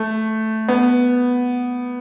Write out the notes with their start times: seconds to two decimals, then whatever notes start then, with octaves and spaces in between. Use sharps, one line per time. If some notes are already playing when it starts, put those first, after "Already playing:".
Already playing: A3
0.68 B3